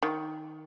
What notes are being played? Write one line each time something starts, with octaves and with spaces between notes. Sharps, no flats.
D#3